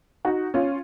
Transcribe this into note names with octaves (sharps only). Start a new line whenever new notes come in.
D#4 F#4
C#4 F4